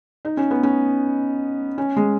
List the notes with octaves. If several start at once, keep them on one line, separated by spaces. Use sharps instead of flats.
D#4
C#4
B3
C#4
C#4
G#3